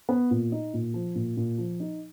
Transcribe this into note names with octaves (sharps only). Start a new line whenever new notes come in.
B3
A#2
D#4
A#2
F3
A#2
A#2
F3
D#4